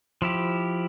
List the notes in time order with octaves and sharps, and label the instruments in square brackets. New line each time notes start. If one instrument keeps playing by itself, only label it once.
[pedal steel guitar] F3 E4 G4